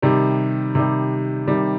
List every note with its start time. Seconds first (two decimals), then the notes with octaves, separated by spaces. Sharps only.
0.02 C3 D#3 G3
0.75 C3 D#3 G3
1.47 C3 D#3 G3